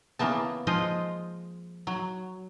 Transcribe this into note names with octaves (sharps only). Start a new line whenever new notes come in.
C#3 E3 A#3 B3 A5
F3 G#3 F4 C5 D#5
F#3